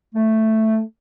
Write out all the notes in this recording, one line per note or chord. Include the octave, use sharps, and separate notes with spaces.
A3